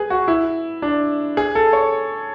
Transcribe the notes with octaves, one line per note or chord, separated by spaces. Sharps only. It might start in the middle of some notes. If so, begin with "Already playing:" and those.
Already playing: G#4 B4
F#4
E4
D4
G#4
A4
C#5